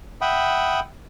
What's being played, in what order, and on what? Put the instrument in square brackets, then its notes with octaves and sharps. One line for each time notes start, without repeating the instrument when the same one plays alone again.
[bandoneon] E5 F#5 G5 B5 D#6